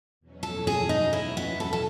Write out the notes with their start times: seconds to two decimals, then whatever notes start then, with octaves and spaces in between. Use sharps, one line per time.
0.20 E2 B2 F#3 C#4
0.43 A4
0.67 G#4
0.89 D#4
1.13 E4
1.37 B3
1.60 A4
1.73 A4